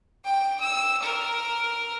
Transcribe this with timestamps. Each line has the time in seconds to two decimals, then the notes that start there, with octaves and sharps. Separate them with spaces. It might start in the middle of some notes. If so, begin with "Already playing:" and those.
0.25 G5
0.61 E6
1.03 A#4